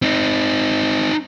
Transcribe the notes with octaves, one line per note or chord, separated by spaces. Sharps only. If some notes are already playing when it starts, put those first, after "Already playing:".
C4 D#4